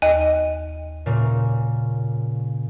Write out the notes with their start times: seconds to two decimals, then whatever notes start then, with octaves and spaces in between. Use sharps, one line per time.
0.02 D#2 D#5
1.06 A#2 C#3